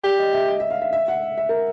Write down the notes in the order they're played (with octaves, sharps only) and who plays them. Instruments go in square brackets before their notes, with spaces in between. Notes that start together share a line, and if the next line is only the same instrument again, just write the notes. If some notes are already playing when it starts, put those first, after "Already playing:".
[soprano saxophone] G4 [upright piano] D5
[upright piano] D#5
E5
D#5
E5
F5
E5
E5
F#5
E5
A#4